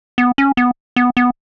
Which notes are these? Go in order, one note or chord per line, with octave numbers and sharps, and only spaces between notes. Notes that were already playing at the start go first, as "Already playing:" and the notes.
B3
C#4
B3
B3
B3